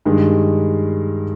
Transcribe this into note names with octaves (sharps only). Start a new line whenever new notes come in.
G2 D#3 G#3